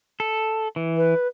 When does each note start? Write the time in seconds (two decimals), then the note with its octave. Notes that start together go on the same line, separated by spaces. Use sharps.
0.20 A4
0.76 E3
0.97 B4